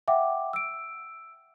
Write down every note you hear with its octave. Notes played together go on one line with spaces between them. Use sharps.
E5 F#5 G5 D6
E6 D7